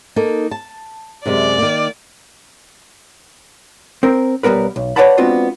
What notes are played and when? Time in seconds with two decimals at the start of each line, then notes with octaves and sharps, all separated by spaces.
0.16 A#3 D#4 A4
0.51 A5
1.26 F#2 C3 G#3 D5
1.58 D#3 A#3
4.03 C4 A#4
4.43 B1 G3 B3 A#4 B4
4.76 B1
4.96 B4 C#5 D5 F#5 A5 B5
5.18 G#3 B3 C4 D4 F4 F#4